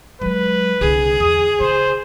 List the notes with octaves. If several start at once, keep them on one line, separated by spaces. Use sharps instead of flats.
F#3 G#3 B4
C2 D3 G#4
E2 D#6
C#3 C5